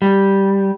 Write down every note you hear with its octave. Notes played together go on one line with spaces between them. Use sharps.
G3